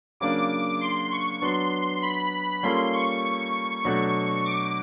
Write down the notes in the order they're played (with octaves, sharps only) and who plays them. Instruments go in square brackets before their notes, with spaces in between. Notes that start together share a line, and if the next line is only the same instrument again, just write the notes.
[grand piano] C#3 F#3 A#3 D4 [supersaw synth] D6
[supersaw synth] C6
C#6
[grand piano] F#3 B3 D4 [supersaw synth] C6
[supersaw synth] B5
[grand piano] G3 A#3 C#4 F4 A4 [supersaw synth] C6
[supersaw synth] C#6
[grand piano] B2 F#3 A3 D4 F#4
[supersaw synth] D6